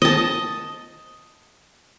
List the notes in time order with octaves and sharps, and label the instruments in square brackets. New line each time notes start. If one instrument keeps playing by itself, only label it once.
[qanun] D#5 A5